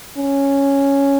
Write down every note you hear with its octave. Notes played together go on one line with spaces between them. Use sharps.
C#4